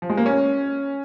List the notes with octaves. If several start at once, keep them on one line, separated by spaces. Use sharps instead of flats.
F3
G#3
A#3
C#4